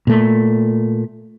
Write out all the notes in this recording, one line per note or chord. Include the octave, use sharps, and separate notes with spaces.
A#2 A3